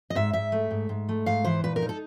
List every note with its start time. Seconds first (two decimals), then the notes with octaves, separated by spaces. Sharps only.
0.10 D#5
0.15 G#2 E5
0.33 G#2 E5
0.52 A3
0.71 G#2
0.89 G#2
1.09 A3
1.26 G#2 F5
1.45 E3 C5
1.64 A#2 B4
1.76 A#4
1.82 D#4
1.89 A4